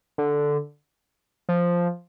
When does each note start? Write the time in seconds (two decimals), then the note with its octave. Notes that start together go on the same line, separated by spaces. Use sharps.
0.18 D3
1.49 F3